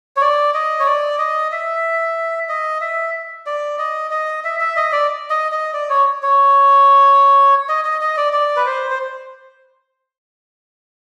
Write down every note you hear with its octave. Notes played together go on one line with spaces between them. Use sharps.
C#5
D5
D#5
C#5
D5
D#5
E5
D#5
E5
D5
D#5
D#5
E5
E5
D#5
D5
D#5
D#5
D5
C#5
C#5
D#5
D#5
D#5
D5
D5
B4
C5
C5